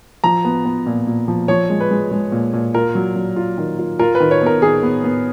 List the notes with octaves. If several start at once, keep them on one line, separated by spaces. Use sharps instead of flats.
F3 A#5
B3
B3
A#2
A#2
F3
F3 C#5
G#3
B4
G#3
G#3
A#2
A#2
F4 A#4
F#3
F#3
F4
D#3
F4
F4 A#4
B4
D#3
C#5
B3 A#4
D#3 G#4
B3
B3